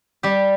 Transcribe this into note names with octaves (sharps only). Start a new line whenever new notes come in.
G3 G4